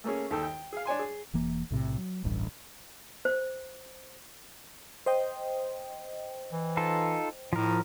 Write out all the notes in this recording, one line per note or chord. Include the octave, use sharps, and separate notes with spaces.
A3 A#3 C#4 G#4
D#2 A4 G5
G5
G#4 F5
D4 C#5 G#5 C6
G#4
E1 E3 A#3
B1 A2 C3
F#3
D1 A1 G2
C5
C5 D#5 G5
E3
D#4 F4 A4
A2 F3 A#4